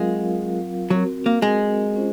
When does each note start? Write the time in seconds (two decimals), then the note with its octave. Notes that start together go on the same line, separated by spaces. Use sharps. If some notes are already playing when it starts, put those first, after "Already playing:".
Already playing: F#3 G#3 C4 F4 A#4 F5
0.90 F#3 C4 F#4 A#4
1.26 A#3
1.42 G#3
1.96 C#4 F4 C5